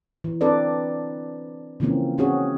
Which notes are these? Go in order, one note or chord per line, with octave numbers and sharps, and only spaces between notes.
E3
C4 D4 A4 B4 D5
C#3 E3 F3 A#3 C4 C#4
C4 C#4 F#4 G#4 C#5